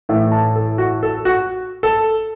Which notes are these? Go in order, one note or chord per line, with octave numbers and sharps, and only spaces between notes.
A2 E3 A3 E5
A5
A4
F#4
A4
F#4
A4